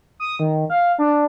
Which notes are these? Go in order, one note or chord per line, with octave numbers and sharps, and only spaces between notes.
D#6
D#3
F5
D4